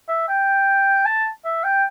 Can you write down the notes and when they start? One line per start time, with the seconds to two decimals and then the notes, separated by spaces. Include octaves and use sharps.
0.08 E5
0.29 G5
1.06 A5
1.45 E5
1.64 G5